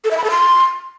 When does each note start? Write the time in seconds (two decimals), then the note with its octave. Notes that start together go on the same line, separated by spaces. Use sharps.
0.04 A4
0.11 E5
0.17 B5
0.24 A4
0.30 C6